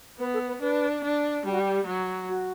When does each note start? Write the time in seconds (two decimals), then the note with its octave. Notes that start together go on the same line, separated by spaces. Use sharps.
0.19 B3 B4
0.34 A4
0.48 B4
0.61 D4 B4
1.04 D4
1.45 G3 G4
1.52 F#4
1.60 G4
1.87 F#3
2.29 F#4